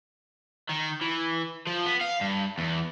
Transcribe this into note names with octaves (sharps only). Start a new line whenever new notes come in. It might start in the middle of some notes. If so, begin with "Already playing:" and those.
D#3
E3
F3
B3
F5
G2
E2